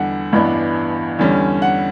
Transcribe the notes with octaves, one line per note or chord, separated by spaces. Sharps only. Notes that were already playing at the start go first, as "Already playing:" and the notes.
Already playing: E2 D3 G3 F#5
A1 G2 E3 B3 D4
E2 D3 G3 C#4
F#5